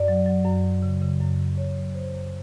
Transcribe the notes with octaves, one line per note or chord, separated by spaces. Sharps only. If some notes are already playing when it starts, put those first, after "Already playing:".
Already playing: F#2 D5
F#3
F#3
F#2
F#2
C#3
C#3
F#2
C#3
F#2 C#5
F#3
F#3 C5
F#2